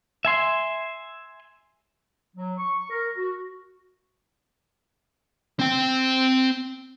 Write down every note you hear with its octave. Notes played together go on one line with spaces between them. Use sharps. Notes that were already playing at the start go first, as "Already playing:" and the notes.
E5 G#5 C6
F#3
C#6
A#4
F#4
C4 G5